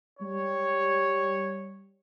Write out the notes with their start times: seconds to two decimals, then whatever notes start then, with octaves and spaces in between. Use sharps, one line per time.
0.20 G3 C#5